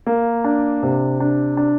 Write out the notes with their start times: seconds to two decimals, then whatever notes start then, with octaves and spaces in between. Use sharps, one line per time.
0.07 A#3
0.44 D4
0.83 C3
1.20 D4
1.57 D4